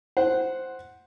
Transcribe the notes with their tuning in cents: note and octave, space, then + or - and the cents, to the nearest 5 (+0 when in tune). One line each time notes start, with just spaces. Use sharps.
C5 +0 F#5 +0